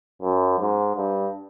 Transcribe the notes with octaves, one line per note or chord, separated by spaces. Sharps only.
F#2
G#2
G2